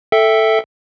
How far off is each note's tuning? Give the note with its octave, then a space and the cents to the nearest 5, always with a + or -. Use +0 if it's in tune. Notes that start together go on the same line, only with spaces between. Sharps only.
A4 +0 E5 +0 G5 +0